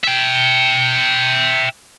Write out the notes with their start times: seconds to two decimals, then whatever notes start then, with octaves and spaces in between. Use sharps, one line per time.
0.04 E5 G5